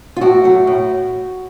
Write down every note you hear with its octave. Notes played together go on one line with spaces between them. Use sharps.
F4
A2 F#4
F#3 A3
A2